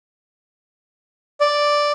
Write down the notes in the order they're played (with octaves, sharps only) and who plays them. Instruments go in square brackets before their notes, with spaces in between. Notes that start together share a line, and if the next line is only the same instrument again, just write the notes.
[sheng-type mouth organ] D5